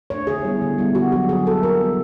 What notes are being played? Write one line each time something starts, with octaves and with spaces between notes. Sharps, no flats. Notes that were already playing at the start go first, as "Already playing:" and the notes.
A3 D4 C#5
D3 G#4
G3 B3 E4
D3
G3 B3 E4
D3 F#4
F#3 A#3 F#4
D3 G#4
F#3 A#3 A4
C3 A#4
E3 G3 B3